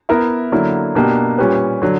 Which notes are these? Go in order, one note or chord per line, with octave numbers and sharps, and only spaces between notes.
B3 E4 A#4 E5
D3 F#3 A#3 E4
B2 A#3 D4 G4
A#2 G3 C#4 G4 B4
D3 F#3